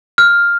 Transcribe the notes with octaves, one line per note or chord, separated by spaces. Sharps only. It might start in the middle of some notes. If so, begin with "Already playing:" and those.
F6